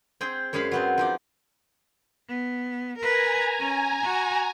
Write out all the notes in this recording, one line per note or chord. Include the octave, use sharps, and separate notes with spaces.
C4 G#4 G5
F#2 G#3 G#4 F5 B5
F#3 B3 C4
F3 D#4 D5
B3
A#4 B4 G#5 A#5
C#4
F#4